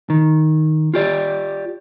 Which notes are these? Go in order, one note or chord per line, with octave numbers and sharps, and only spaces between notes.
D#3
F4 G4 D5